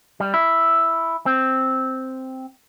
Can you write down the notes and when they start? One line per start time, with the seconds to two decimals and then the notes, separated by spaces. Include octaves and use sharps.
0.20 G3
0.34 E4
1.26 C4